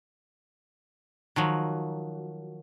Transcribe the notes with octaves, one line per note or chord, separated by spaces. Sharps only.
D#3 F3 F#3